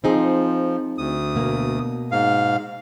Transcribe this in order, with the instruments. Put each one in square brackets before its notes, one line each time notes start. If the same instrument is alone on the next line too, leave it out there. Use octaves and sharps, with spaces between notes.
[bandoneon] F3 [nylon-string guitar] C4 D#4 G#4
[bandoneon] D2 D#6
[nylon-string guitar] B2 A#3
[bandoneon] G#2 F5